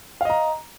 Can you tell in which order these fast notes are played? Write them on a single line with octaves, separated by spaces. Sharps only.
F5 D#5 A#5